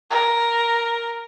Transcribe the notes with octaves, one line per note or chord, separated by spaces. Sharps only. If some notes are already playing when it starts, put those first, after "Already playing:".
A#4